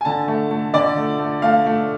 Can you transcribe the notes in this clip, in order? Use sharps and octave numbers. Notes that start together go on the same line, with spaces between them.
G#5
D3 A5
A3
A3
D3 D5
A3
A3
A3 F5
A3